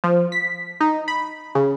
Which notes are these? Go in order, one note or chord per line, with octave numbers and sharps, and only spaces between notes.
F3
B6
D#4
B5
C#3